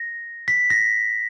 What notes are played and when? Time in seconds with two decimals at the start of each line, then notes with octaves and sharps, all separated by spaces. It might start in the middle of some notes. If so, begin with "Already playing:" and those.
Already playing: A#6
0.48 B6
0.70 A#6